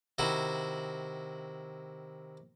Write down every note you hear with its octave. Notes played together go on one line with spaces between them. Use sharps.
C3 D#3 E4 F#4